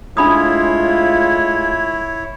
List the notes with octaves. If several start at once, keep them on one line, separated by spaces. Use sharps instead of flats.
A2 G#3 D4 E4 F4 C#5 B5 D#6